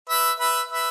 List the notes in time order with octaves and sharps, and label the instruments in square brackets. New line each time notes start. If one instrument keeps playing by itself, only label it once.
[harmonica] B4 E5
B4 E5
B4 E5